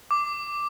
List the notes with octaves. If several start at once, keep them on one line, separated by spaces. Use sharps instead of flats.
D6